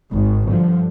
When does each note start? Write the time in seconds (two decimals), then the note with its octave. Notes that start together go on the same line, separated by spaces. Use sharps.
0.12 G#1 G#2 D#3
0.45 G2 D3 F3